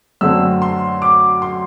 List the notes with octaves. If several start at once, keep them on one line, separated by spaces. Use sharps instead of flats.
F#2 D3 A3 C4 E6
C6
D6
C6